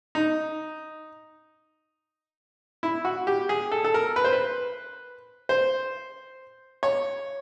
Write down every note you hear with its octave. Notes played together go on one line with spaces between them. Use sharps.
D#4
E4
F#4
G4
G#4
A4
A4
A#4
B4
C5
B4
C5
C#5